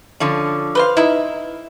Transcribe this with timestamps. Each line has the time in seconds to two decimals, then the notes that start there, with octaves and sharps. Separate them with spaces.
0.20 D3 F3 C#4
0.75 B4 C5 F5
0.97 D#4 E4 B4 E5